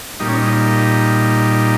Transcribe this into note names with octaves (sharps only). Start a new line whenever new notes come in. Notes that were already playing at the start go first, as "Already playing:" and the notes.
A#2 G3 D#4
C#4
D#4